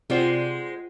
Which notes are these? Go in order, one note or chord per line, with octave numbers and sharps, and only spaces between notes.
C3 G#3 F4 F#4 C5 D5 G5